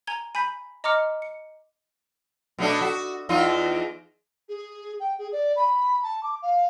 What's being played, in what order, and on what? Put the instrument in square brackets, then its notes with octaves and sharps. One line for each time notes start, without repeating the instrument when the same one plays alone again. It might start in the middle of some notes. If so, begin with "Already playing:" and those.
[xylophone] G#5 A#5 G#6 G7
G#5 B5 G6 B6
D#5 A#5 C6 D6 F6 C#7
C#7
[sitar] B2 A3 D4
F#4
E2 D#4 F4
[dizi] G#4
G5
G#4
D5
B5
A5
D6
F5